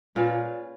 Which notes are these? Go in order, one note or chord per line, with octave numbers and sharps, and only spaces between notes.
A#2 C#4 F4 G#4 B4